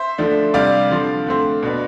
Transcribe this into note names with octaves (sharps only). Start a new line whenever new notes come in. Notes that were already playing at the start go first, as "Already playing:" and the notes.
Already playing: C5 E5
D3 F3 A3 D4
C3 G3 D4 D5 F5
D3 F3 C4
D3 A3 C4
B2 B3 D4